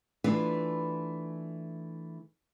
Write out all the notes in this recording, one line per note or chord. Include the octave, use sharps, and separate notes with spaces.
E3 A3 D4 F4 B4